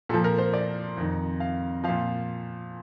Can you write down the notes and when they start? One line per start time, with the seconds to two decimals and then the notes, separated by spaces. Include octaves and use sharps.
0.09 A#2 A4
0.14 F3
0.24 A#4
0.39 C5
0.54 D5
0.97 F2 D#3
1.40 F5
1.84 A#2 F3 F5